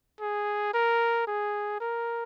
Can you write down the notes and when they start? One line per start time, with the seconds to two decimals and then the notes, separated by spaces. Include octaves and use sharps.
0.21 G#4
0.74 A#4
1.28 G#4
1.80 A#4